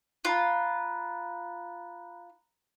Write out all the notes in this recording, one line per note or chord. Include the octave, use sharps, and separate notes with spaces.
F4 A#5 B5 F#6